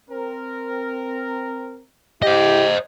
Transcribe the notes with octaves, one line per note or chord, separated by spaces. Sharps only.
C4 A#4
E4 G4 C5 D#5